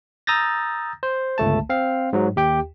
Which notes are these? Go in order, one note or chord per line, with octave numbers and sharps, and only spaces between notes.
A#5 D#6 E6 G6 A6 A#6
C5
G1 C#2 A3 A5
C4 F5
G#2 F#3
D#2 G4 G5